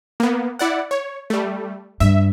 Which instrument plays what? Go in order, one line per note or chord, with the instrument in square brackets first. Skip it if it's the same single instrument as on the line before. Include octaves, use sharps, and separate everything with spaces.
[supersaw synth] A#3 B3
E4 D5 F#5
C#5
G3 A3
[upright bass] G2 [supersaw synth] E5